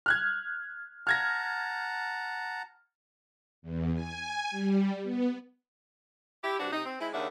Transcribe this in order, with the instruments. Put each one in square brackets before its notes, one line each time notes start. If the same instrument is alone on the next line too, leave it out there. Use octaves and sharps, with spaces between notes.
[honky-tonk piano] F6 F#6 G#6
[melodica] F#5 A5 A#5 [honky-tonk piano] F6 G#6 A#6
[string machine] E2
G#5
G3
B3
[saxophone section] E4 G4
G2 C3 D4 F#4
C3 D#4
C4
G#3 C4 E4
D#2 C#3 D4 E5 F#5